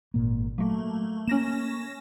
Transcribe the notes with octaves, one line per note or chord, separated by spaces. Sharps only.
G#1 A#2 A#3
F#3 A3 A#3
A#3 C#4 A#6 E7